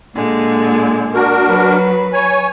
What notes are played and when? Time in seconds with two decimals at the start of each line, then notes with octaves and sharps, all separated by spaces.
0.15 A#2 D3 G#3
1.14 D4 F#4 A#4
1.44 F#3 B4
2.13 C#5 G#5